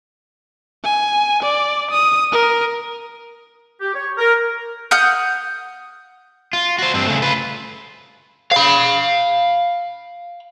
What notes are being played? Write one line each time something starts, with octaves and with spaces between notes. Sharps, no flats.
G#5
D5
D#6
A#4
G4
C#5
A#4
F#5 D#6 F6 G6
F4
F#4 C5
G2 C4
C#3 A3
F4 B4
F5 B5